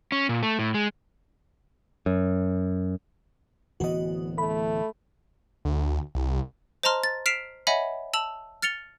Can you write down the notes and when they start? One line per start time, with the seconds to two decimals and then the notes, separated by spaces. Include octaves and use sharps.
0.12 C#4
0.29 A#2
0.43 A3
0.59 A2
0.74 G#3
2.06 F#2
3.80 D1 E3 B3 F#4 D#5
4.38 A3 B5
5.65 D2
6.15 C2
6.83 C5 D#5 A5 A#5 C6 F6
7.04 A6
7.26 F6 B6 C7 D7 E7 F7
7.67 C#5 D#5 E5 F#5 G#5 B5
8.14 A5 E6 F7 F#7
8.62 F6 A6 C#7 F7 G7